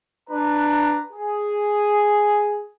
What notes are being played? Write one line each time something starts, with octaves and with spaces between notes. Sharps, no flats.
D4 B4 A#5
G#4